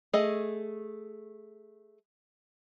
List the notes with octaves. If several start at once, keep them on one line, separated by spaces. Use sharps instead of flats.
A3 G#4 D#5